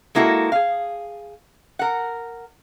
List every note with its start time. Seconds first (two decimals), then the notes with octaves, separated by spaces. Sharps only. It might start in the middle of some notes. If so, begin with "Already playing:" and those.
0.15 G#3 A#3 E4 F#4 A4
0.52 G#4 F5
1.79 A#4 F#5